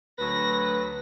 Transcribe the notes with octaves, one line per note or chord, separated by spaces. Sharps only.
D2 F#3 B4 A#6